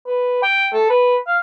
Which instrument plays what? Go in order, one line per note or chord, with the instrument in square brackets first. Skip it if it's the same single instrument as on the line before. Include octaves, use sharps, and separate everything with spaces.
[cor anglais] B4
G5
A4
B4
F5